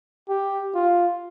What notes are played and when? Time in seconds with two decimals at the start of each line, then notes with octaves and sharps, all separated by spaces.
0.29 G4
0.75 F4